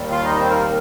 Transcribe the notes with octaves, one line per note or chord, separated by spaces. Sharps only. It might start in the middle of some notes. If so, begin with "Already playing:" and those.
Already playing: D#2 D#3 G3
F4 F5
D#4 D#5
C4 C5
A#3 A#4